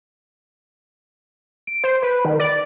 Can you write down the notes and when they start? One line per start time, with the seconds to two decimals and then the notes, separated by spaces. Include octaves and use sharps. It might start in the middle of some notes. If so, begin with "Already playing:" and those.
1.67 D7
1.84 C5
2.02 B4
2.25 D#3
2.40 D5